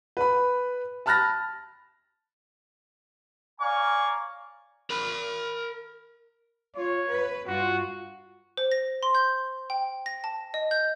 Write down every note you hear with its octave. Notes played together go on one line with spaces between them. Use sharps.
B4 B5
A5 B5 F6 F#6 A6 A#6
C#5 D5 F5 G#5 A#5 C#6
A#4 B5
F4 C#5
B4
G2 F4 F#4
C5
A#6
C6
G6
G5
A#6
A5
D#5
G6